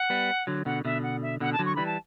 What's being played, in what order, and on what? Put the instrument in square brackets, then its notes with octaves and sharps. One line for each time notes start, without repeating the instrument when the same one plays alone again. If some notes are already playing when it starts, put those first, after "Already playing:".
Already playing: [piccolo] F#5
[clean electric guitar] G3 B3
D3 F#3
[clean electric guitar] B2 D3 [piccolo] F#5
[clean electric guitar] B2 D3 [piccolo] E5
[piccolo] F#5
E5
[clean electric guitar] B2 D3 [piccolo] F#5
[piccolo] A5
[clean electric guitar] D3 F#3
[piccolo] C#6
[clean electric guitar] E3 G3 [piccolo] B5
[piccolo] A5